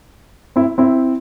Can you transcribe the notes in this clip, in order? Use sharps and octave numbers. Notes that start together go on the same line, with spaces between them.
C4 E4
C4 E4